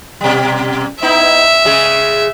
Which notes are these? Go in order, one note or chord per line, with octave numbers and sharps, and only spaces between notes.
B2 G3
B3 D#4 E4 E5
C#3 G#3 G#4